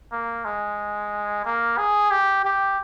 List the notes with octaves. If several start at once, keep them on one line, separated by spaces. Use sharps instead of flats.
A#3
G#3
A#3
G#4
G4
G4